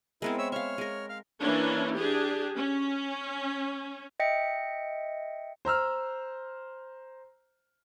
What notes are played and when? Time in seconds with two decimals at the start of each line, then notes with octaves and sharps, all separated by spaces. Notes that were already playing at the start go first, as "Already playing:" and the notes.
0.22 G#3 B3 C4 E4 A#4
0.38 C#5 E5 E6
0.52 C#5 E5 F5 F6
0.78 G#3 A#4
1.09 F5 F6
1.40 E3 A#3 C#4 D4
1.95 D4 G4 G#4
2.56 C#4
4.20 D#5 E5 G5 C#7
5.65 C5 A#5 E6 F6